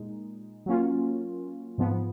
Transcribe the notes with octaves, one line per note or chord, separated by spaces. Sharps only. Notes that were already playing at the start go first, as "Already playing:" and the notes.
Already playing: A#2 G#3 D#4
F#3 A#3 C#4 F4
G#2 F3 B3